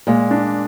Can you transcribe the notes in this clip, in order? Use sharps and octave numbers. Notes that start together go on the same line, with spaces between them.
A#2 G#3
D4